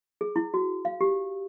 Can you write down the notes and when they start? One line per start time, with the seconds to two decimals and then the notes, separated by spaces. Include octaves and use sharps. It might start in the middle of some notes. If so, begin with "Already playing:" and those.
0.21 G#4
0.36 E4
0.54 F#4
0.85 F5
1.01 G4